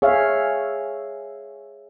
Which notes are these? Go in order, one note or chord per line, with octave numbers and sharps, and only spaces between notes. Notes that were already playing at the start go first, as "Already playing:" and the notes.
G#4 C#5 E5 F5